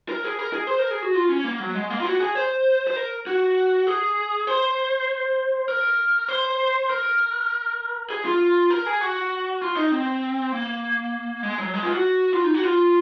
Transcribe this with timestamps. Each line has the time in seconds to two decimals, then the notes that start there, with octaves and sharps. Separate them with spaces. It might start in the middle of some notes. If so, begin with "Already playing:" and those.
0.09 A#4
0.24 G#4
0.39 A#4
0.53 G#4
0.67 C5
0.79 A#4
0.91 G#4
1.02 F#4
1.15 F4
1.29 C#4
1.45 A#3
1.60 F#3
1.75 G#3
1.90 A#3
2.00 F4
2.05 F#4
2.20 G#4
2.35 C5
2.87 C5
2.96 A#4
3.27 F#4
3.87 G#4
4.47 C5
5.68 A#4
6.28 C5
6.89 A#4
8.10 G#4
8.25 F4
8.70 A#4
8.86 G#4
9.01 F#4
9.62 F4
9.76 D#4
9.92 C4
10.52 A#3
11.43 G#3
11.58 F#3
11.74 G#3
11.83 F4
11.93 F#4
12.34 F4
12.44 D#4
12.54 F#4
12.64 F4